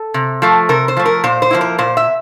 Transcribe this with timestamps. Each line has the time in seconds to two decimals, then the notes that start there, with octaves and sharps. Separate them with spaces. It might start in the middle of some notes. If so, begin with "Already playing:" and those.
Already playing: A4
0.14 C3
0.42 F3 A3
0.69 C3 A#4
0.88 C5
0.97 F3 A3
1.06 A#4
1.24 A#2 C5
1.42 C5
1.51 F3 A#3 E4
1.61 A#4
1.78 A#2 C5
1.97 E5